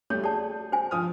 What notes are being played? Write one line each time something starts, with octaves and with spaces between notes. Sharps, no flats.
G3 A3 C#5
G#4 D5 A5
C5 G#5
F3 D#6 F6